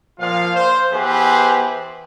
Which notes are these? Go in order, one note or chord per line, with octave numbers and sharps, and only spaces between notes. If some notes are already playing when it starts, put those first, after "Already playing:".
A#2 F3 F4 F5
C5
E3 B3 G4 G#4 B4 C5